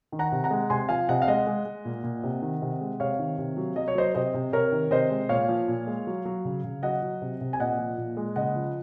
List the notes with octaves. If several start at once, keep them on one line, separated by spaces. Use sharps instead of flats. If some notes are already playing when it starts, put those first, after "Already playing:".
D#3
F#5 A#5
C3
F#5 A#5
G#3
C3 G#5 C6
F3 F5 G#5
C3 D#5 F#5
F5
G#3 D#5 F#5
G#3
G#3
A#2
A#2
C3
D#3
C3
G#3
C3 C#5 F5
D#3
C3
F#3
F#3 D#5
C#5
F#3 C5 D#5
C3 C5 D#5
C3
C3 A#4 C#5
D#3
C3 C5 D#5
G#3
A#2 C#5 F5
F3
A#2
G#3
F#3
F#3
C#3
C#3
F#3 D#5 F#5
F#3
C3
C3
G#5
A#2 D#5 F#5
F3
A#2
G#3
C#3 D#5 F#5
F3